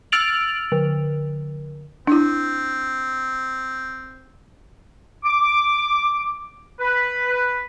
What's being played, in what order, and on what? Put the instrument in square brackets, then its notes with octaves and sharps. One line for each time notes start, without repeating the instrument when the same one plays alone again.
[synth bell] E6 F6 A6 D7 F7 F#7
D3
[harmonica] C4 [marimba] D4 E4
[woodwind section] D6
B4